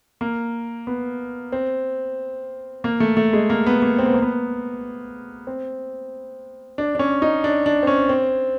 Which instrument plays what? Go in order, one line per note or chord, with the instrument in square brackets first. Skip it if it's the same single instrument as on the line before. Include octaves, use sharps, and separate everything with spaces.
[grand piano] A#3
B3
C4
A#3
A3
A3
G#3
A#3
B3
A#3
C4
B3
A#3
B3
C4
D4
D4
C#4
D#4
D4
D4
C4
C#4
C4